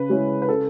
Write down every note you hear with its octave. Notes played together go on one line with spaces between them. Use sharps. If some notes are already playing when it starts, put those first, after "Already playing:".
Already playing: C#3 B4
G#3 C#4 E4
B4
C#3 A4